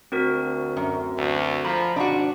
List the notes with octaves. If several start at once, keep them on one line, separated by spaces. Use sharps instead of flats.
D2 C4 F#4 A#4
F#2
D2
F3 A#5 B5
G#1 D4 F#4